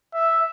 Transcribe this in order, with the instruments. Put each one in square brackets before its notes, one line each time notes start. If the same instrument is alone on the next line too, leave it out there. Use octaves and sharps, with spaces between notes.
[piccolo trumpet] E5